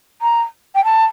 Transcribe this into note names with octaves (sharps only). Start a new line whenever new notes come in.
A#5
G5
A5